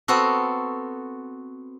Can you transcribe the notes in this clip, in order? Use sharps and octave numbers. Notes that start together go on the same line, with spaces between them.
B3 C4 F#4 A4